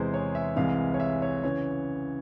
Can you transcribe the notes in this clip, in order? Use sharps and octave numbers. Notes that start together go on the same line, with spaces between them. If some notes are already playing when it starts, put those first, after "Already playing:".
Already playing: E2 C3 E3 G#3 G#4 C5
C#5
E5
C2 C3 E3 G#3 F5
C#5
E5
C#5
C#3 E3 C#5